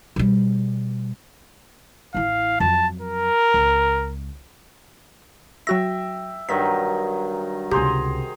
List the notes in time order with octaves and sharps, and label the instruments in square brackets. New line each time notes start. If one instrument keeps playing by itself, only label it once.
[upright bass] B2 G3
[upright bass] A1 E4 [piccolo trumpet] F5
[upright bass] F2 F#3 [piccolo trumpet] A5
[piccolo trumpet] A#4
[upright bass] C#2
[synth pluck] F#3 F#4 A#6 [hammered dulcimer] E5 G5
[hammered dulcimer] G2 D#3 F#3 [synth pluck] B6
[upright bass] C#2 C3 [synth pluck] G4 [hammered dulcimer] G#4 C5 A#5